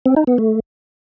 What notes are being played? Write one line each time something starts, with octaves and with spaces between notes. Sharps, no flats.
C4
D#4
B3
A3